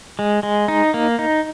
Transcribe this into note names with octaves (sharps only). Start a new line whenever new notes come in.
G#3
G#3
D#4
A#3
D#4